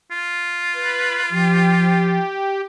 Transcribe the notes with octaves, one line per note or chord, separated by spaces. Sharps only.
F4
B4
F3 G4